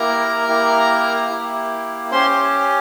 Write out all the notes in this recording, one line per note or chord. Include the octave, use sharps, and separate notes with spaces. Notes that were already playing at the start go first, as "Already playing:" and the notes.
Already playing: A#3 E4 G4 A#4 A#5
A#3 E4 G4
A#3 E4 G4
C#4 G4 C5 C6